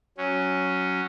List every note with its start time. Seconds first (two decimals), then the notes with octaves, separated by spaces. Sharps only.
0.18 F#3 C#4